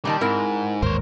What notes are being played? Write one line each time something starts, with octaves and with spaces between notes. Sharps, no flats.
A#2 D#3 G3 A5
G#2 C4 E4 A#4
A1 D#2 G#2 A#4 C5 C#5